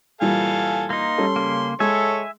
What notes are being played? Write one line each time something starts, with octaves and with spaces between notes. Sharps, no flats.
A#2 E3 G3 A4 F5 G#5
A#3 D#4 C6
G3 C#4 A4
C#3 A#3
G#3 A4 C#5 E5 G#5